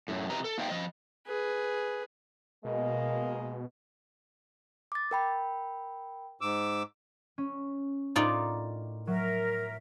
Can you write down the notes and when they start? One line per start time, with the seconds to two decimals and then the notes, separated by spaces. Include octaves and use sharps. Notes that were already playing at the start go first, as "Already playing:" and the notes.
0.08 F#2 A2
0.30 C3 E3 B4 D#5 A#5
0.44 A4
0.58 A#3 D#4 C5 D#5 E5 G5
0.70 F3 D#5
1.27 G#4 B4
2.65 B2 G#3 A#3 D#5
4.92 D6 A6
5.11 A#4 G5 B5
6.41 G#2 D6 E6
7.38 C#4
8.16 A2 D#4 F4 A#4 D5
9.07 F#3 A#4 E5